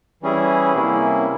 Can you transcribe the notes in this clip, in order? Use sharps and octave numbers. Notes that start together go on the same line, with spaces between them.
E3 G3 C#4 E4 G#4
C3 G3 A#3 C#4 E4